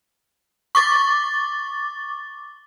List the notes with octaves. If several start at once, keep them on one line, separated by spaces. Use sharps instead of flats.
C#6 D6 A6